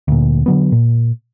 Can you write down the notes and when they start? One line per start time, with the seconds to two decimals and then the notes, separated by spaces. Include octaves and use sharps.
0.08 D2 A#2
0.46 D3 F#3 B3
0.72 A#2